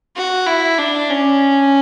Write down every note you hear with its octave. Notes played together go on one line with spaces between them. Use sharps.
F#4
E4
D4
C#4